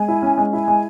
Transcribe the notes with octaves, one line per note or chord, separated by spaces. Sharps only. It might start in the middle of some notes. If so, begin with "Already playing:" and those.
Already playing: G#3 G#5
E4
C#4
G#3
E4 G#5
G#3